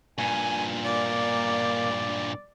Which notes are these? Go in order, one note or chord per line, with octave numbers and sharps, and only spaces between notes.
G2 A#2 G#5
A#3 D5